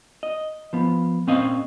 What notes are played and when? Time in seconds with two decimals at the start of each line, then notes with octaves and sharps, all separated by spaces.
0.23 D#5
0.73 F3 B3
1.27 A#2 C4 C#4 D#5 F5